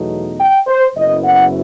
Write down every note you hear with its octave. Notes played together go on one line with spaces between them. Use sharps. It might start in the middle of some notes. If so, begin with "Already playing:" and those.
Already playing: E2 B2 F#3 A3 D#4
G5
C5
F#1 F#2 F#3 B3 E4 D#5
F#5